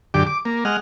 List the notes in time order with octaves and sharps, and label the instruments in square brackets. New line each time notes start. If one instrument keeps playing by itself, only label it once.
[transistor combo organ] F#2 D3 G4 D6
D6
A#3
G#3 D#5 F#5 F6